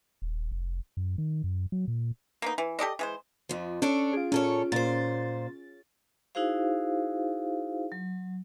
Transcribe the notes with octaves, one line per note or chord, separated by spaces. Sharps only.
D#1
F1
F#2
D#3
F#2
F#3
A#2
A#3 B3 D#4
E3
G4 A4 D5 D#5
E3 G#3 C5
F2 F3
C#4 D4 A4 C#5 D7
F4 G#4
A#2 C#4 A4 C#5
A#2 C5 A6
D#4 E4 F#4 G#4 C5 F5
F#3